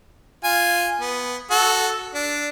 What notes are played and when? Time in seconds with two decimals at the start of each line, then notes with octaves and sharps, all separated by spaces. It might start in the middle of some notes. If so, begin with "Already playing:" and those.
0.44 F4 G#5
1.01 B3
1.51 F#4 A4
2.15 D4